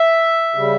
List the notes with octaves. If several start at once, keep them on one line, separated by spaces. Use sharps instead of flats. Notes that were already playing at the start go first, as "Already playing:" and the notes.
Already playing: E5
C#3 G3